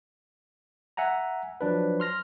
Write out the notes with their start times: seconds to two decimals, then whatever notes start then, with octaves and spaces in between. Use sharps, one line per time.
0.97 E5 F#5 G#5 A#5
1.61 F3 F#3 D4 B4
2.00 C6 F6 A#6